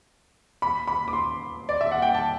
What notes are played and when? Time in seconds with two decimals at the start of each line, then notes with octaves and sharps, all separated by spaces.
0.62 B5
0.88 B5
1.08 D6
1.13 C6
1.69 D5
1.81 E5
1.92 F#5
2.02 G5
2.14 A5